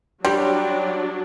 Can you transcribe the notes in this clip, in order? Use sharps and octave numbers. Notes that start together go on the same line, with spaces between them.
F#3 G3 D4 G4 C6